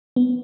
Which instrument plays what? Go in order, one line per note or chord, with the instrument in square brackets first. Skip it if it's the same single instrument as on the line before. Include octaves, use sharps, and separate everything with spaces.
[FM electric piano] B3